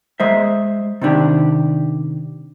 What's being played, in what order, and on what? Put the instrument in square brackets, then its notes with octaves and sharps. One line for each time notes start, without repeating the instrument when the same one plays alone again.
[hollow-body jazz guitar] G#3 C5 E5
C3 D#3 D4 G4